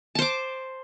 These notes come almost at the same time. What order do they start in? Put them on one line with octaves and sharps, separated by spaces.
A5 C5 D6